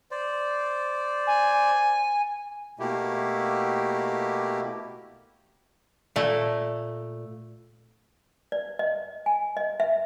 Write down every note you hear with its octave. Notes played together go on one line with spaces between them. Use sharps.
C5 D5
G#5
B2 A3 A#3 E4 G4
A#2 A3
D5
D#5
G#5
D#5
E5